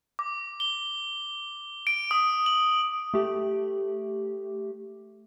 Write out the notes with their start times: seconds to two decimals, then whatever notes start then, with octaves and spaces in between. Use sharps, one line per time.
0.19 D6
0.60 G7
1.87 D7
2.11 D#6
2.46 F#7
3.14 A3 G4